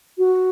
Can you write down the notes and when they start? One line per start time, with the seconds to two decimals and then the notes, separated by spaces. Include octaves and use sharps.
0.18 F#4